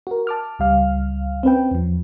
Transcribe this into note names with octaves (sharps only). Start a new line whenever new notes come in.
F#4 A#4
A5 D6 F6
C#2 G3 F5 F6
C4 C#4 B4 G5
E2 F3